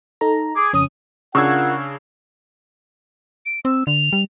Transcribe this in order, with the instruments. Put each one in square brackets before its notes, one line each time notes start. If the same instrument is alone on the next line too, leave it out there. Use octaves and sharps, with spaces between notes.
[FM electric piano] D#4 A4 A#5
[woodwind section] G#4 D6
[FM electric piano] F2 C#3 C#4 [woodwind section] D#6
[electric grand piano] C#3 D4 [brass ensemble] F4 A#4 F#5 [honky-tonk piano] C#6 E6 G#6
[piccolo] D7
[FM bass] C4 [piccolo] E6
[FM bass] D3 [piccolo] F7
[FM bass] G3